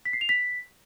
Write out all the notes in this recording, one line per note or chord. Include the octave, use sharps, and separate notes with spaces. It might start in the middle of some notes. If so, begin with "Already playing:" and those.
B6
C7
F7
B6